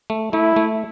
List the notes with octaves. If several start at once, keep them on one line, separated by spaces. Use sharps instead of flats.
A3
A3 E4
A3